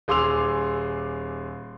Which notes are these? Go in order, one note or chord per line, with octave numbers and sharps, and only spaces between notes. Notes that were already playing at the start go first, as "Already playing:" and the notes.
D#1 G#4 C6 D6 E6 F7